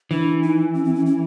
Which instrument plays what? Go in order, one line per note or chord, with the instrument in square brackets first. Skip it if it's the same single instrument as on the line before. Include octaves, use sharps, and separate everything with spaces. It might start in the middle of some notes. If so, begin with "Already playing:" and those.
[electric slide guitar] E3 [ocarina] D4
[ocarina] D#4
C#4
C4
C#4
C#4